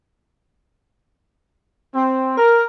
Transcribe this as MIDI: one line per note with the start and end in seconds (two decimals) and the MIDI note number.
1.94 2.35 60
2.37 2.63 70